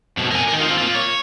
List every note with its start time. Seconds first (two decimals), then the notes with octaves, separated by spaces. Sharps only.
0.17 F2 B2
0.31 A#4 G#5
0.48 D#3 A#4
0.60 C4 F4
0.78 A#3 F4
0.95 C#5